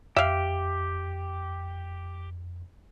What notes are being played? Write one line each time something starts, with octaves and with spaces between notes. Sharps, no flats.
F2 G4 E5 F5